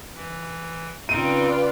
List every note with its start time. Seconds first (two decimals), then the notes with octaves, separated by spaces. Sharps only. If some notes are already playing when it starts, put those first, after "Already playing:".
0.14 E3
1.09 C#3 C4 D#4 F4 B4 D5 G5 D#7